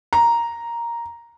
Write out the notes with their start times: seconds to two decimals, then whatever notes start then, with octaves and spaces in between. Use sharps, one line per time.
0.13 A#5